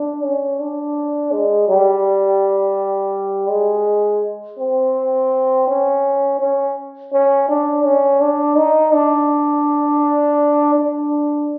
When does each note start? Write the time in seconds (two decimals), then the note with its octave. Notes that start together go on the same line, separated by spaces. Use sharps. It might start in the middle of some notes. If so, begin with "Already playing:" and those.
Already playing: D4
0.23 C#4
0.60 D4
1.32 G#3
1.68 G3
3.50 G#3
4.59 C4
5.67 C#4
6.40 C#4
7.13 C#4
7.48 D4
7.85 C#4
8.21 D4
8.57 D#4
8.94 D4
10.75 D4